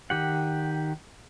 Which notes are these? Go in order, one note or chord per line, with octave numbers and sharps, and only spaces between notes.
D#3 G4 F#5